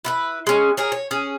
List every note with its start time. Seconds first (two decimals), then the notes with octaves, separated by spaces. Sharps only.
0.05 E4 F4 B4
0.47 G#3 C#4
0.77 G#4 A#4 C#5
0.92 C#5
1.11 C#4 G#4